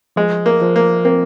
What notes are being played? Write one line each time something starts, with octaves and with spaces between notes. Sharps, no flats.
F3 G#3
A#3
F3
A#3
A#3 C4